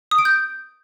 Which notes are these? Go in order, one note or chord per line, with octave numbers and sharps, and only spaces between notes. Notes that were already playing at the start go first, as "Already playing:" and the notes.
D#6
D7
G6